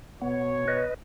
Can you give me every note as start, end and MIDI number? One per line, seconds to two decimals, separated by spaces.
0.22 0.84 47
0.22 0.65 59
0.22 0.84 73
0.68 0.94 71
0.68 0.94 75